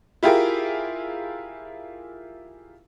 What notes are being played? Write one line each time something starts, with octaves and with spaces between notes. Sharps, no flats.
E4 F4 G4 G#4 A#4